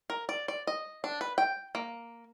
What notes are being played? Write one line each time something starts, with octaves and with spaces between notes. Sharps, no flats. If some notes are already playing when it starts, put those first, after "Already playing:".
A#4
D5
D5
D#5
D4
B4
G5
A#3